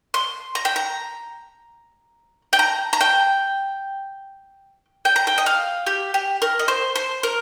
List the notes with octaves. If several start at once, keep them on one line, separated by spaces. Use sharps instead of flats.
C6
A#5
G5
A#5
G5
A#5
A#5
G5
G5
A#5
G5
D#5
F5
G4
G4
A#4
D#5
C5
C5
A#4